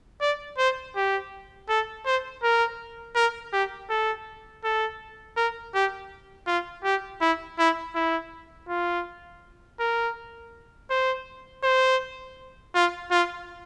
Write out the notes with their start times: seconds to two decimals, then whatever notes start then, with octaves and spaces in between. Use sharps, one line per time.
0.21 D5
0.58 C5
0.96 G4
1.69 A4
2.06 C5
2.43 A#4
3.16 A#4
3.53 G4
3.90 A4
4.64 A4
5.37 A#4
5.74 G4
6.47 F4
6.84 G4
7.21 E4
7.59 E4
7.95 E4
8.69 F4
9.80 A#4
10.90 C5
11.63 C5
12.75 F4
13.11 F4